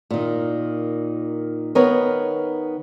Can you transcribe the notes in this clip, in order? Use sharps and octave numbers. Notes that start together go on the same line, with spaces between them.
A#2 D#3
D#3 B3 A#4 B4 C#5